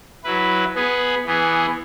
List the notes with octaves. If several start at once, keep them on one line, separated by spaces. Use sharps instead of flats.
F#3 E4 B4
B3 G#4 B4
E3 B3 G#4